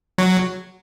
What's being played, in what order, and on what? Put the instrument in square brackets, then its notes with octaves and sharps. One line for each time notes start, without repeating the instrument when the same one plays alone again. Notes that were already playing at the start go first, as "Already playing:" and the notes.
[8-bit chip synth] F#3